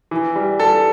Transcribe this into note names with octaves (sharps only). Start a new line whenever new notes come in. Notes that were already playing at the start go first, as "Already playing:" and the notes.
E3
G3
G3 A4